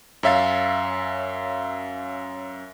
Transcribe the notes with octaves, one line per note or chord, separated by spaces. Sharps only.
F#2 C#4 E5 F5 A6